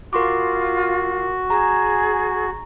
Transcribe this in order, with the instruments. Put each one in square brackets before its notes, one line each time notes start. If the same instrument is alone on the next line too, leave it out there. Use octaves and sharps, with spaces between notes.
[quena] F4 [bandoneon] F#4 [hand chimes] A#4 C6 D6
[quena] G#4 [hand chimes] A#5